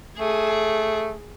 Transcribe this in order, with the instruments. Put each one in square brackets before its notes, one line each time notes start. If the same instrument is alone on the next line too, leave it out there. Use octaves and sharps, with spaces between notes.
[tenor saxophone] A3 [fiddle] G#4